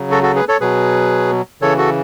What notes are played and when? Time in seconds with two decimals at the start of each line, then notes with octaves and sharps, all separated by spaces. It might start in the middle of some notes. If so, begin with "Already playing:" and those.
Already playing: C#3 F#3
0.11 F#4 A4
0.23 F#4 A4
0.36 G#4 B4
0.48 A4 C#5
0.61 B2 F#3 G#4 B4
1.61 C#3 E3 A4 C#5
1.78 F#4 A4